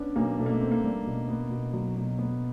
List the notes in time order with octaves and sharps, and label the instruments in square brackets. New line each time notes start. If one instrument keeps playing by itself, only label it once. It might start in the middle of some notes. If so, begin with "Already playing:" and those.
Already playing: [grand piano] B3 C#4 D4
[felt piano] B1 [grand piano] A#3
[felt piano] B2 [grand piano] A3
[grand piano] A#3
A3
[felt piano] C4
[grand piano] A#3
[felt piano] G3
B2
B3
B2
F#3
B2
B3